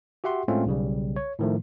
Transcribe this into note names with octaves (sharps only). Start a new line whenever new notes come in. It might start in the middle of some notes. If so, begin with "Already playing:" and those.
F#4 G4 E5 F#5 C6
A2 G#3 A3 C4 C#4 F4
B1 C#3 G3
C#5
A2 D#3 F3 A3